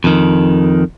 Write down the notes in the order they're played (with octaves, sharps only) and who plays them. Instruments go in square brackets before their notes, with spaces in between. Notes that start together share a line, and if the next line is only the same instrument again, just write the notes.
[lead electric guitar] F2 D#3